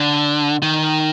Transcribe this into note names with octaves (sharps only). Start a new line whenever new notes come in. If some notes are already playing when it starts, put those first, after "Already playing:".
Already playing: D3
D#3